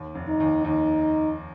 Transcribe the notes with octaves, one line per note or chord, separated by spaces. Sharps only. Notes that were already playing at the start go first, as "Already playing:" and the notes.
Already playing: D#2
F1
D#4
D#2
D#2 D#4